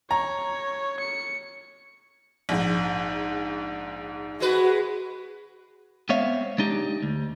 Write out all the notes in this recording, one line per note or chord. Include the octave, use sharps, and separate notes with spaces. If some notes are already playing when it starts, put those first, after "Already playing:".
C#5 A#5
C#7
A#1 G#2
G#3 F#4 B4
G#3 B3 C4 C#5 E5 F5
G#3 D4 D#4 G4
D2